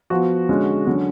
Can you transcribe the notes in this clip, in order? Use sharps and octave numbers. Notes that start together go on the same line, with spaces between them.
F3 B3 F#4
D3 G#3 C#4
D3 F#3 C#4